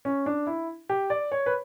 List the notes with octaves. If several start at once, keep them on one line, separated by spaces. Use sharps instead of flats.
C#4
D4
E4
G4
D5
C#5
B4